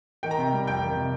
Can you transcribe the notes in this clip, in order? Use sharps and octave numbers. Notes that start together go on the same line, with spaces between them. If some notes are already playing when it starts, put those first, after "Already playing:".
D#3 G5
A#5
C3 G5
G3
F2 G5
D#3
C3